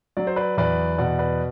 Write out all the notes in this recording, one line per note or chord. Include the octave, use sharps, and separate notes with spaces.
F#3 D5
C5
B4 D5
E2 B4 D5
B2 D5 F#5
B4 D5